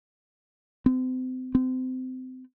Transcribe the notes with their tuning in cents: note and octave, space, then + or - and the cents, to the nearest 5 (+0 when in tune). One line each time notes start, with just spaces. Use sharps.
C4 -35
C4 -30